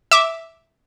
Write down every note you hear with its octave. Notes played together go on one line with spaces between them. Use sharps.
E5 D6